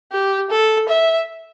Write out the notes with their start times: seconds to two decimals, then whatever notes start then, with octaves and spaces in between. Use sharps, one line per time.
0.12 G4
0.50 A4
0.89 E5